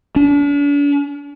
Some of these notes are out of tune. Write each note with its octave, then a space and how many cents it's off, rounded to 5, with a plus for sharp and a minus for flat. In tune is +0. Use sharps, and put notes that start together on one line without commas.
D4 -40